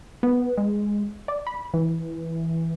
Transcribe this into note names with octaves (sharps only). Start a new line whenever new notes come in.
B3
G#3
D5
B5
E3